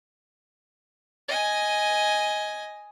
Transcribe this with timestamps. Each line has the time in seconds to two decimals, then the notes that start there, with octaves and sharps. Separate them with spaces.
1.28 D#5 G#5